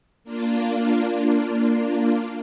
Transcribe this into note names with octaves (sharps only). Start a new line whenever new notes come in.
A#3 D4 F4